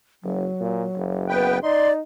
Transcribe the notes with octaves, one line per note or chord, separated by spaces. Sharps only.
F#1 F#3
A#2
F#1
B3 B4 G5
D#4 D5 C6